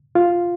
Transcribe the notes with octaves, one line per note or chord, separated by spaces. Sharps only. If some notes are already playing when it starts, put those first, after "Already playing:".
F4